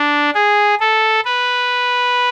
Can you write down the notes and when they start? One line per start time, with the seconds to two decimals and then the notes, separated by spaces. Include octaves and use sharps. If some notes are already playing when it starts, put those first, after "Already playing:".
Already playing: D4
0.35 G#4
0.80 A4
1.25 B4